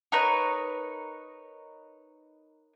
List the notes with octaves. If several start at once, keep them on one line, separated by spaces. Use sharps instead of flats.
D#4 A#4 B4 C#5